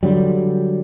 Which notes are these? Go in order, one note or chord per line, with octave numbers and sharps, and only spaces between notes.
D3 F#3 G3